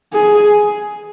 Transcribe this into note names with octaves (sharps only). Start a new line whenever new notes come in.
G#4